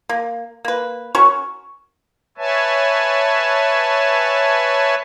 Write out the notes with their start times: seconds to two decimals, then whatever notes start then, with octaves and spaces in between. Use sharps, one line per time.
0.09 A#3
0.65 A#3 B4
1.15 C#4 F#4 A#4 C#6
2.38 B4 C#5 E5 G#5 A5